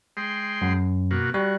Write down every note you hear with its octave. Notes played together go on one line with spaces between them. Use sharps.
G#3 G5 C6
F#2
B2 A#3 F#4
G3 F#4